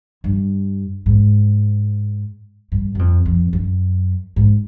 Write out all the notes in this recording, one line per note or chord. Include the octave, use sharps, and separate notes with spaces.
G2
G#2
G2
F#2
F2
F2
F#2
G#2